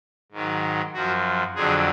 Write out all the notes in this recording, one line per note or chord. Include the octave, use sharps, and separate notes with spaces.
G#2 D#3 F#3
F#2 F3 F#4
F2 D3 F#3 G#4